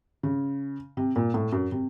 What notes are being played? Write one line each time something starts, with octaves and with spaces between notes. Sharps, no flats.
C#3
C3
A#2
A2
F#2
C3